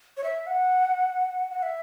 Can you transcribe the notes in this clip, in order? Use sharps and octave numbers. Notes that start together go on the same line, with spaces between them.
C#5
E5
F#5
F#5
E5